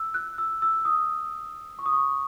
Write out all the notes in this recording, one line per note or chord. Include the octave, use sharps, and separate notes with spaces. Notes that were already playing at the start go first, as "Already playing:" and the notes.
Already playing: E6
F#6
E6
E6
D#6
C#6
D#6
C#6